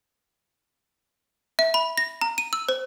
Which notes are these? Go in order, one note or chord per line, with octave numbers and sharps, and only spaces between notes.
E5
B5
A#6
A#5
D#7
E6
C5